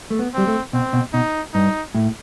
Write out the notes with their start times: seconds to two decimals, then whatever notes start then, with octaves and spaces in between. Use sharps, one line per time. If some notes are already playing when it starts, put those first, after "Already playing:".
0.10 A3
0.19 B3
0.34 G3 C4
0.47 A3
0.73 B2 C4
0.93 B2
1.13 B2 D#4
1.54 G2 D#4
1.95 A2